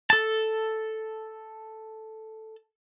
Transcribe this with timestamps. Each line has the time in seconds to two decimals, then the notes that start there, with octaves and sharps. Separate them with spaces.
0.10 A4 A5